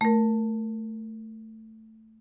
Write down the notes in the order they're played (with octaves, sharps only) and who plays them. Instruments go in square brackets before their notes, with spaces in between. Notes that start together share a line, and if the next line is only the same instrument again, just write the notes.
[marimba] A3 A#4